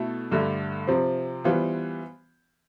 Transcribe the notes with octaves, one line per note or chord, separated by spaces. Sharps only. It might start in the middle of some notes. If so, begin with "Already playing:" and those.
Already playing: B2 A3 E4 A4
G2 D3 A3
C3 F3 C4
E3 G3 B3 F4 C5